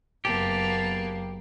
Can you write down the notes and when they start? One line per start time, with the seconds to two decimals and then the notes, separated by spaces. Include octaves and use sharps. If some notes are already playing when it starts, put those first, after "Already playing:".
0.25 F#1 A#3 B3 G4 A5